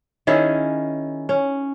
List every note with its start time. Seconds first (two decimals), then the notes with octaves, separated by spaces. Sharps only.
0.27 D#3 C#4 E4 G#4
1.29 C#4